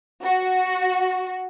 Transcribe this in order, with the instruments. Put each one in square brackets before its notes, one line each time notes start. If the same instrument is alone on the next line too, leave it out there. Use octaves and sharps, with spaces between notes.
[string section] F#4